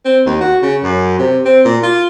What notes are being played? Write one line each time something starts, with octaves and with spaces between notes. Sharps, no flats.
C4
D#2
F#4
C#3
F#2
C3
C4
A#2
F4